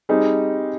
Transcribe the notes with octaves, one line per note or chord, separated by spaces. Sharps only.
G3 C4 D#4 G#4 C5